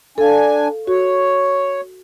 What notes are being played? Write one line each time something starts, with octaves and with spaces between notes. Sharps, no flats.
D4 A4 F5 G#5
F#4 C#5